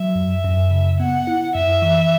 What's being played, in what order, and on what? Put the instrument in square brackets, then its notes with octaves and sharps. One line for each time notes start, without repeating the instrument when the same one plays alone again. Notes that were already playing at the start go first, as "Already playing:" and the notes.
Already playing: [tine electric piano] F#3 [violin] E5
[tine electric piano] F#2
F#2
C#3
[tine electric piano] B3 [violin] F#5
[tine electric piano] E4
[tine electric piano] F#2 [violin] E5
[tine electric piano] E3